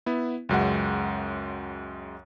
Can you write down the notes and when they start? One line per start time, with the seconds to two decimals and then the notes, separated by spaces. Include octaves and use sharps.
0.06 B3 E4
0.49 C#2 F#2 G#3 F#5